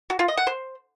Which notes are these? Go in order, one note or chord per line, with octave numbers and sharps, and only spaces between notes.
F#4
F4
D#5
F#5
C5